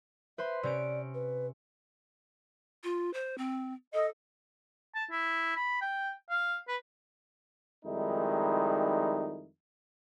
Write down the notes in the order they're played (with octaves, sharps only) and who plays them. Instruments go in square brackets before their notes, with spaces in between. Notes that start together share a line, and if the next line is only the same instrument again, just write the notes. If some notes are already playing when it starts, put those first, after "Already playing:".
[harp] B4 C5 C6 [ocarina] E5
[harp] C3 C#4 D7 [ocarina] D5
[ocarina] B4
[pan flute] F4
C5
C4
[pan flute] A4 [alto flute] D#5
[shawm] A5
E4
B5
G5
F5
B4
[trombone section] F2 D#3 G3 G#3 D#4 E4